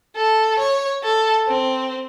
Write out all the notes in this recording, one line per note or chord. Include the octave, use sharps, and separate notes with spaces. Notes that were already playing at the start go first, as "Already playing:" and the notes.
A4
C#5
A4
C4